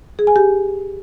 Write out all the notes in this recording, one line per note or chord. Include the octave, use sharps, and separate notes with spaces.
G#4
G#5
G4